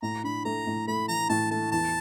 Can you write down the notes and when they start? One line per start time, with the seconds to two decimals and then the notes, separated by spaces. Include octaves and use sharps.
0.02 A2 A#5
0.24 D4 B5
0.45 A3 A#5
0.67 A2
0.87 A3 B5
1.08 E3 A#5
1.29 A2 A5
1.51 A3 A5
1.72 E2 A5